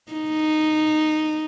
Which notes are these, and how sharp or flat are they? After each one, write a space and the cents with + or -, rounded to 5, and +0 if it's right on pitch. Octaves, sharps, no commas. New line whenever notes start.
D#4 -10